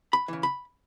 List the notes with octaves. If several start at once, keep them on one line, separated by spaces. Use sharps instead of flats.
B5
C#3 E3
B5